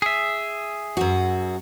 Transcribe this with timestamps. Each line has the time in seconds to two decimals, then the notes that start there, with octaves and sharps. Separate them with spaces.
0.02 G#4 E5
0.97 F#2 F#4